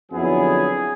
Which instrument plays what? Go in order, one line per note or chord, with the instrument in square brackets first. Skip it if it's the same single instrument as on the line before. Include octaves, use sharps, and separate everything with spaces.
[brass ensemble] F2 D3 F#3 B3 E4 G#4